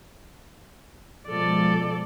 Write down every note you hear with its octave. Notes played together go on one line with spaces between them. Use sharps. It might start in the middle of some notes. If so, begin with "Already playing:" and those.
B2 F3 G#3 A4 D5